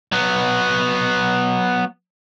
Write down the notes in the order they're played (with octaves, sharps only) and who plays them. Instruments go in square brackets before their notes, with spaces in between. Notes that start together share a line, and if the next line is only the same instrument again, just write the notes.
[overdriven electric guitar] F#3 B3